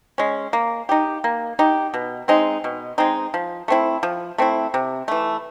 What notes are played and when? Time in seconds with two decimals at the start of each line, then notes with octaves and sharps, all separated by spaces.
0.18 G#3 C#4
0.53 A#3
0.89 D#4 G4
1.24 A#3
1.59 D#4 G4
1.94 B2
2.28 G#3 C4 D#4
2.64 B2
2.98 G#3 C4 D#4
3.34 F3
3.68 A3 C4 E4
4.03 F3
4.38 A3 C4 E4
4.74 C3
5.08 E3 A3